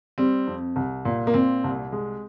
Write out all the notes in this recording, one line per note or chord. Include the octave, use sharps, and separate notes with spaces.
G3 C4
F2
C2
A#2
A#3
A#2 C4
C2
G#3